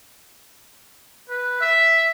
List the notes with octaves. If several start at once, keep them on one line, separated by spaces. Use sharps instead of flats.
B4
E5